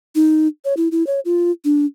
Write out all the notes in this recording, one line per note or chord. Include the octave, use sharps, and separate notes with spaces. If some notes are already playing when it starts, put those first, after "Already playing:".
D#4
C#5
E4
E4
C#5
F4
D4